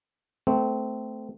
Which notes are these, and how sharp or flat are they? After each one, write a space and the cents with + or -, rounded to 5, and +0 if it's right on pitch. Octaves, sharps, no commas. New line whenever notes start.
A3 +0 C4 -20